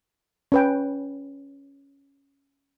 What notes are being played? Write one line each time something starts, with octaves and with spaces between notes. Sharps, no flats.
C#4 B4 G5